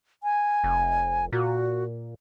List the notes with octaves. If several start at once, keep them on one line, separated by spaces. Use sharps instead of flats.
G#5
F1
A#2 F#4